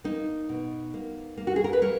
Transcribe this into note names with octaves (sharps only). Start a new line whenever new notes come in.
A#3 D#4
B2
A#3
A#3
F#4
G#4
A#4
B4
A#3 A#4 C#5